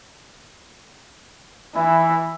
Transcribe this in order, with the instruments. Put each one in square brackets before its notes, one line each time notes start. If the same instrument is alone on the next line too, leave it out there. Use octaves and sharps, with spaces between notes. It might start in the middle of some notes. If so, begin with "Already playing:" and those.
[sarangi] E3 [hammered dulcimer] E4